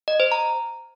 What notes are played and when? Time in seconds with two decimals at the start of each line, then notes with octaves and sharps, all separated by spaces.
0.08 D#5
0.20 C5
0.32 A#5